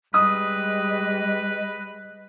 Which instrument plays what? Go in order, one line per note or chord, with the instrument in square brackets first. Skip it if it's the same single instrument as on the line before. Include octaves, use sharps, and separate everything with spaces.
[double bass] G3 G#3 [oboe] B4 [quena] D#5 [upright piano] D#6